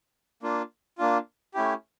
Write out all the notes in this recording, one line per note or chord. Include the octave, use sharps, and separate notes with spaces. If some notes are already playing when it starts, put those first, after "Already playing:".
A#3 D4 F4
A#3 D4 F4
A3 C#4 E4 G4